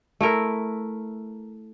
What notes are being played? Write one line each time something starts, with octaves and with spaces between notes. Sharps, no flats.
A3 E4 A#4